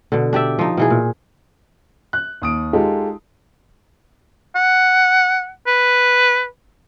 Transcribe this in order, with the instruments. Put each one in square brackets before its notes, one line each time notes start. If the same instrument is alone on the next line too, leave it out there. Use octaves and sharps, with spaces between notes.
[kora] B2 D3
D4 G4 D5 E5
F3 D#4
B2 E3 G#4
A#2
[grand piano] F#6
D#2 D#6 D7
G#3 D#4 F4 G4 A4
[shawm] F#5
B4